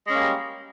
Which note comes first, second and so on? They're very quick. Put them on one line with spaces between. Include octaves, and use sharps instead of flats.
G#3 C#4 A#3 G3